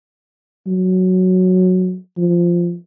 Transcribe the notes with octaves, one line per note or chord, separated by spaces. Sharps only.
F#3
F3